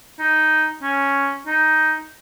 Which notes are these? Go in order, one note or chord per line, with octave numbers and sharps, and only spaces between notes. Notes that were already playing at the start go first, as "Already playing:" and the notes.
D#4
C#4
D#4